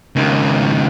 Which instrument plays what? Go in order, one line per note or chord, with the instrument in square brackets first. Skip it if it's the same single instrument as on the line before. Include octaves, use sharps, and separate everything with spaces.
[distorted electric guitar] C#2 D#3